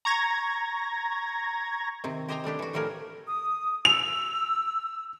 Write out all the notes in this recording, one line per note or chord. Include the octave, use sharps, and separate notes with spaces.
A#5 C#6 G#6 A#6
C3 D#3 C4
G4 C5 D#5 G5 G#5 A#5
G3 A3 D4 G4
E3 F#4
A2 F3 G3 A3 A#4 G#5
D#6
E6 F7